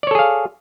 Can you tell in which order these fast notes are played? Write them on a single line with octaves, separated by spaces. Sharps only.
D5 C#5 A4 G#4 F5